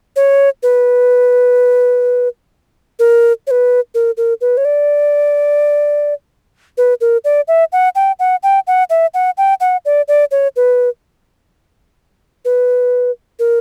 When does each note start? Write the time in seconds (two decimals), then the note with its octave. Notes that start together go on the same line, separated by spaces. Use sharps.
0.16 C#5
0.63 B4
2.99 A#4
3.47 C#5
3.51 B4
3.94 A#4
4.17 A#4
4.41 B4
4.57 C#5
4.65 D5
6.78 B4
7.01 A#4
7.25 D5
7.48 E5
7.73 F#5
7.95 G5
8.19 F#5
8.43 G5
8.67 F#5
8.90 E5
9.14 F#5
9.38 G5
9.60 F#5
9.85 D5
10.08 D5
10.31 C#5
10.56 B4
12.45 B4
13.39 A#4